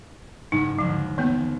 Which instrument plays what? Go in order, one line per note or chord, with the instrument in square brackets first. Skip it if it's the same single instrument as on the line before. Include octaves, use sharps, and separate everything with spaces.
[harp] F#1 G#2 [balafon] D#4
[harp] F#1 D#2 D3 [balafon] F3
[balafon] E3 A#3 B3